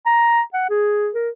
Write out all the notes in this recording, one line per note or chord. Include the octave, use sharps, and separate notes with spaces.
A#5
F#5
G#4
A#4